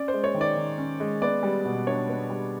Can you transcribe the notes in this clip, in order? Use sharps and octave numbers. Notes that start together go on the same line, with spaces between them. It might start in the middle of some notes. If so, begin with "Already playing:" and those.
Already playing: C#4 D5
C5
G#3
C#5
D#3
D5
D#3
C#4
G#3
B3 D5
G3
B2
D4 C#5
B3
G3